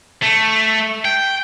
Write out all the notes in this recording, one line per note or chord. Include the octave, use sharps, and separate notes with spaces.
A3
G5